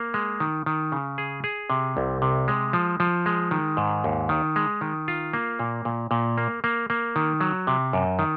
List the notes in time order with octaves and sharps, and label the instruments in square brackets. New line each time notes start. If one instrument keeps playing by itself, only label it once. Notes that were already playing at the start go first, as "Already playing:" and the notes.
Already playing: [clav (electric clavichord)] A#3
G#3
D#3
D#3
C#3
G#4
G#4
C3
C2
C3
G#3
F3
F3
G#3
D#3
G#2
D#2
D#3
G#3
D#3
F4
A#3
A#2
A#2
A#2
A#3
A#3
A#3
D#3
F#3
C3
F#2
D#3